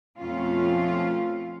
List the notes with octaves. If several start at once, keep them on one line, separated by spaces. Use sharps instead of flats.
F2 B2 A3 C#4 F4 F5